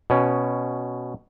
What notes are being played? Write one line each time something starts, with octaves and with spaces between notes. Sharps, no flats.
B2 C#4